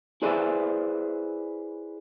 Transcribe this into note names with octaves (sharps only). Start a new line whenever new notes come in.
E4 G#4 B4 C5 D5 E5